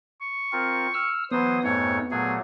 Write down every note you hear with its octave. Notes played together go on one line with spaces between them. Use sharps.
C#6
C4 F4 A#4
E6 F6
E3 F#3 B3 B4 C5 D#6
F2 G#2 A3 C#5
A#2 F#3 A3 G#4